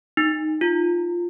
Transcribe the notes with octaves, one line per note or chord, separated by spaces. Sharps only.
D#4
F4